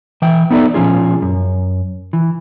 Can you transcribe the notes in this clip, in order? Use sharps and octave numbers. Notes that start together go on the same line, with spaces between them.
E3 E5 G5
B3 D#4 A4 C5 D5 E5
A#2 F3 C#4 F4 G#4
F#2
E3